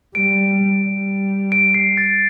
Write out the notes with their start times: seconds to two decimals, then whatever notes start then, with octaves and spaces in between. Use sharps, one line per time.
0.15 G3 D7
0.84 G3
1.52 D7
1.74 C7
1.97 A6